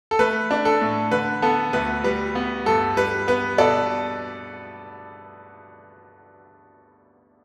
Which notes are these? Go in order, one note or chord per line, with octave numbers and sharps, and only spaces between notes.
A4
A3 B4
D4
A4
A2
D3 B4
B3 A4
D2 B4
G3 B4
B3
G2 A4
G3 B4
B3 B4
B2 A4 D5